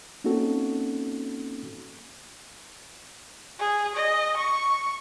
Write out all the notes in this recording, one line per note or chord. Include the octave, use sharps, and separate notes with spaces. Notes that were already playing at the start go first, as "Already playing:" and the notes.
A#3 C4 C#4 D#4 F#4 A4
G#4
D#5
C#6